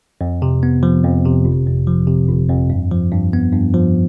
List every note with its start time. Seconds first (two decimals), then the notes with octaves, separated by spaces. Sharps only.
0.21 F2
0.42 C3
0.63 B3
0.83 F3
1.04 F2
1.25 C3
1.45 G1
1.67 F2
1.87 F3
2.07 C3
2.28 G1
2.49 F2
2.70 G2
2.91 F3
3.12 G2
3.33 B3
3.53 G2
3.74 F3